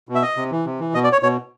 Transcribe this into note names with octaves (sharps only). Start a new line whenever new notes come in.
B2
E5
D#5
C3
E3
C3
E3
B2 D#5
D5
C#5
B2 C#5